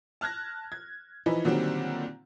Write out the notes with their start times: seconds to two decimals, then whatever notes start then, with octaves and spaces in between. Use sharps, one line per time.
0.21 A5 F6 F#6 G#6 A#6
0.72 G#6
1.26 E3 F3 D#4 E4 B4
1.45 A#2 D3 D#3 F#3 G3 C4